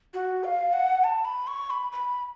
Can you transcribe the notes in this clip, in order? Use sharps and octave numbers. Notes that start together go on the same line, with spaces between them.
F#4
F5
F#5
A5
B5
C#6
B5
B5